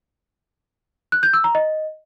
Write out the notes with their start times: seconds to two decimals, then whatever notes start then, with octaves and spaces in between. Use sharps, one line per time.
1.12 F#6
1.23 G6
1.33 E6
1.44 A#5
1.55 D#5